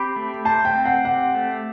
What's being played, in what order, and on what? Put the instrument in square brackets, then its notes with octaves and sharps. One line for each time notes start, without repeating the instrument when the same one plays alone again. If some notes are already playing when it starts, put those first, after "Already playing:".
Already playing: [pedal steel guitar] C4 G4 [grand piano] B5
[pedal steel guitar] A3
[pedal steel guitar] C5 [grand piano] A5
[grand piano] G5
[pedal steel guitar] C4
[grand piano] F#5
[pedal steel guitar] G4 [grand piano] F#5
[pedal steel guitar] A3